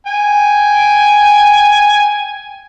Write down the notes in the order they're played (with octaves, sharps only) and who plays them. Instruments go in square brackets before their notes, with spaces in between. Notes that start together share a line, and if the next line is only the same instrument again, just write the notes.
[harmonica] G5 G#5